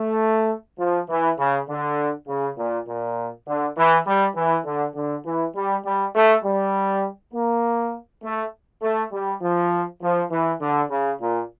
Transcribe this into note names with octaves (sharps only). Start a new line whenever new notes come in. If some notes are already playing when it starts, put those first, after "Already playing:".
Already playing: A3
F3
E3
C#3
D3
C#3
A#2
A#2
D3
E3
G3
E3
D3
D3
E3
G3
G3
A3
G3
A#3
A3
A3
G3
F3
F3
E3
D3
C#3
A#2